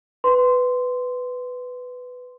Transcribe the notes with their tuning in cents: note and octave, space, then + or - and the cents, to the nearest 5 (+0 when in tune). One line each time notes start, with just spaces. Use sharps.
B4 +10 C6 -10